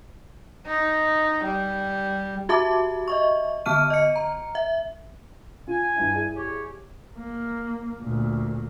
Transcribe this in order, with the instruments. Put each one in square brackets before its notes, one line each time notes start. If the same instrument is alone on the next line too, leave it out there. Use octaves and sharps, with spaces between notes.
[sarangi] D#4
G3
[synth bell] F#4 G4 E5 A5 D6
D#5 E5 C#6
D3 B3 A5 F6 D#7
D#5 C#7
A#5
E5
[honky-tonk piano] F4 [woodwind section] G#5
[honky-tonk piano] G2 E4
E4 G#4 D5
[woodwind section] G4 C#5
[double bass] A#3
D2 A#2